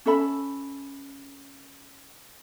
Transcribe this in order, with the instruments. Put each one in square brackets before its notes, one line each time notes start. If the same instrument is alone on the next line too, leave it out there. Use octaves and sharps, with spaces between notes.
[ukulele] C#4 A4 E5 B5